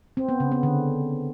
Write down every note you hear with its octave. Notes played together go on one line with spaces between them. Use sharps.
C4
B3
C#3
B3
D3